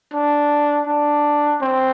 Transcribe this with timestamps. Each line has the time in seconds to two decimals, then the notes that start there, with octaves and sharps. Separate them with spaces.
0.13 D4
0.87 D4
1.61 C4